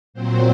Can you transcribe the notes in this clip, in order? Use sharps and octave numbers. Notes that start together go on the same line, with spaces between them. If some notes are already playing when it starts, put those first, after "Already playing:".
A#2 F#3 C4 C5